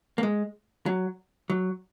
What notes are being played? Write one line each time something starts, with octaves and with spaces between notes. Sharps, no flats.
A#3
G#3
F#3
F#3